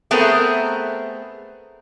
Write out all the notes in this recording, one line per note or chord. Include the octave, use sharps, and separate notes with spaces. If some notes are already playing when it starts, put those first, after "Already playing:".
A3 B3 C4 G#4 A#4